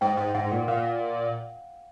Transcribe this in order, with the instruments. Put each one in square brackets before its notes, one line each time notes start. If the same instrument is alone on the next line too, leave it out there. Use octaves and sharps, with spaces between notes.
[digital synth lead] G#2 [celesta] G5
[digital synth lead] G#2
[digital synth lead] G#2 [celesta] F#5
[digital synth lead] A#2
[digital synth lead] A#2 [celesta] F5